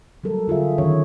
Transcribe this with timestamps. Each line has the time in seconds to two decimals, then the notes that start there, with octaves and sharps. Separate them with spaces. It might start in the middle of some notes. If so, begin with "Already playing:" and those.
0.24 F#3 G3 A4 A#4
0.48 D3 F4 G#4 E5
0.78 D#3 C#4 C#5